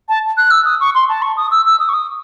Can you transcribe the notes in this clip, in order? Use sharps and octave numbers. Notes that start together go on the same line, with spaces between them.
A5
F#6
E6
D#6
C#6
C6
A5
C#6
D#6
E6
E6
D#6
C#6
D#6